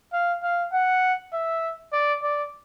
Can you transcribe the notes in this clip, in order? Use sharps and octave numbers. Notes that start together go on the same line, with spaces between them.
F5
F5
F#5
E5
D5
D5